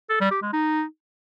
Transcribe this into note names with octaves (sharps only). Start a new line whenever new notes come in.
A4
G3
G4
G#3
D#4